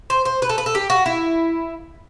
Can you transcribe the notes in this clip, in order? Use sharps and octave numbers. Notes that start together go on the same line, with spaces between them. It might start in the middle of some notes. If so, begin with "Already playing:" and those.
C5
C5
B4
A4
B4
A4
G4
F#4
E4